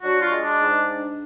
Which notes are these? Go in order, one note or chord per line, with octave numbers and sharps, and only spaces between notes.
F#3 D4 F#4
F4
G#3
D4
G#2
D4